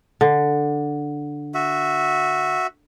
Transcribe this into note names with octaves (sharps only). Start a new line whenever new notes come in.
D3
F#4 E5